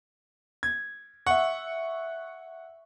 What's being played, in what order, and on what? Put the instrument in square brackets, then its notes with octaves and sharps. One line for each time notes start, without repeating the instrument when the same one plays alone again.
[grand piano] G#6
[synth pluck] E5 C#6 [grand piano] F#5